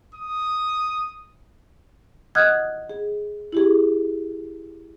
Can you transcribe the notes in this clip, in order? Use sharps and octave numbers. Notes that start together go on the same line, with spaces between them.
D#6
D#5 F#5 D#6 F6 F#6 G#6
G#4
E4 G4 G#4